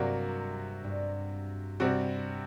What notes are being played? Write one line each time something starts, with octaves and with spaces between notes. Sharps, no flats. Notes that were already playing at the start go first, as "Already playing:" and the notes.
Already playing: G2 C3 F#3 A#3 F#4
G2
C3 G3 C4 F#4